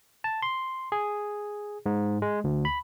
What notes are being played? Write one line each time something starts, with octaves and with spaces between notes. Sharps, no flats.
A5
C6
G#4
G#2
G#3
D2
B5